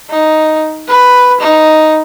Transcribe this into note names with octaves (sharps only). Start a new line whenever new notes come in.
D#4
B4
D#4